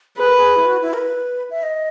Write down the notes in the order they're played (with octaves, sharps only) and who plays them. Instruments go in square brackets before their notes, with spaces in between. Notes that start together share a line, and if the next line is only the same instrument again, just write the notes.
[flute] G#4 [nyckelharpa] B4
[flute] A#4
G#4
E4
F#4
E4
A#4
B4
E5
D#5